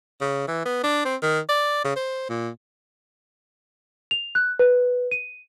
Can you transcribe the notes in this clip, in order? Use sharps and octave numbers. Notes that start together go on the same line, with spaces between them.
C#3
E3
B3
D4
C4
D#3
D5
C#3
C5
A#2
F7
F#6
B4
D#7